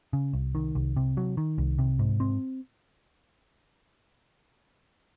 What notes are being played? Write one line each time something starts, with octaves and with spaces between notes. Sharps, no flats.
C#3
C2
D#3
C2
C3
F#3
D#3
C2
C3
G#2
C4